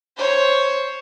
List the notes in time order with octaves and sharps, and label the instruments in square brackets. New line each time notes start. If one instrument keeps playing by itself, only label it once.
[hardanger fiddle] C5 C#5